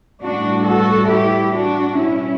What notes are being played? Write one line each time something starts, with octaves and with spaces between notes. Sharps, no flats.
A2 E3 G3 D4 F#4
F#4 A4
E4 G4
D4 F#4
B2 G3 C#4 E4